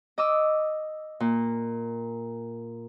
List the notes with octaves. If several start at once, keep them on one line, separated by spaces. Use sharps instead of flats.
D#5 D6 E6
A#2